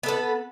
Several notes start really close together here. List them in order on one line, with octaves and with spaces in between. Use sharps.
B3 A4 B4